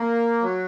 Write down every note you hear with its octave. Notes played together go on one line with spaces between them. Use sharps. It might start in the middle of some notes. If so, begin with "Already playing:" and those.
Already playing: A#3
F#3